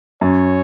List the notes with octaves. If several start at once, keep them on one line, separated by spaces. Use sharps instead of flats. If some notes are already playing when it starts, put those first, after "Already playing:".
F#2 C#5